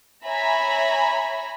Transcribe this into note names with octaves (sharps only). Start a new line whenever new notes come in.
C#5 E5 G#5 A#5 B5